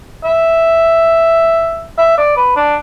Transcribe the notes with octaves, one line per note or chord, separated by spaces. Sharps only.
E5
E5
D5
B4
D4